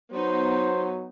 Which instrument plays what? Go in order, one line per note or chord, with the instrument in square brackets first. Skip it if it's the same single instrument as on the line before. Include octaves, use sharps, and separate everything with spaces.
[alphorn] F#3 [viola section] B3 D#4 [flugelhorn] C5